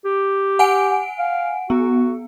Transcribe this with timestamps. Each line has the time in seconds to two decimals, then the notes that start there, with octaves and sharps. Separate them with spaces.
0.05 G4
0.59 F#5 G#5 D7
1.19 F5
1.70 B3 F#4